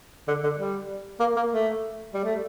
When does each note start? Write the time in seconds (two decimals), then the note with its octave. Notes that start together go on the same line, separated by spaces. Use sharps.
0.28 D3
0.43 D3
0.58 G3
1.20 A#3
1.36 A#3
1.51 A3
2.14 G3
2.24 A3